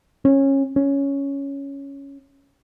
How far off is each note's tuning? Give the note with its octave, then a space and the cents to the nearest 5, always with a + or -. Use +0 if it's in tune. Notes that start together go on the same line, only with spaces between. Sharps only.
C#4 -20
C#4 +5